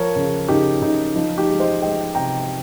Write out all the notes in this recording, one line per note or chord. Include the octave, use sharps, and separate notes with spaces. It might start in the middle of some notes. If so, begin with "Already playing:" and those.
Already playing: F3 A#4 C#5
C#3
C#3 D#4 G4
C#3 D#4
F3 D#4
D#4 G4
G#3
C5 D#5
G#3 D#5 G5
C3 G5 A#5